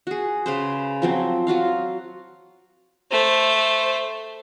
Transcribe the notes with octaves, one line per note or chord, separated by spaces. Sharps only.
F#4 G#4
C#3 B4 C5
F3 F#3 C4
F#3 F4 F#4 F5
A3 C5